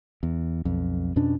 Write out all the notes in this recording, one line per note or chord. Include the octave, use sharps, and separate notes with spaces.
E2
B1 F2
F2 B2 C#4 D4